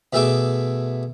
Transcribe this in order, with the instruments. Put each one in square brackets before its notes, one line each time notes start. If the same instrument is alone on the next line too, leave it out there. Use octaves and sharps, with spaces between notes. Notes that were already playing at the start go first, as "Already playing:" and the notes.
[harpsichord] B2 A3 G#4 E5 D6